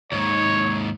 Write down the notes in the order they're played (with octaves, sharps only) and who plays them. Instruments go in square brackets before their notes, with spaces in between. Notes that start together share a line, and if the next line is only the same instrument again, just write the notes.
[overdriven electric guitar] D#2 G#2 [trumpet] C#5